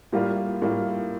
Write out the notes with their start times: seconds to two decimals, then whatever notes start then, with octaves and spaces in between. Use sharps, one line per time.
0.13 A2 G3 A#3 F4
0.62 A2 G3 A#3 F4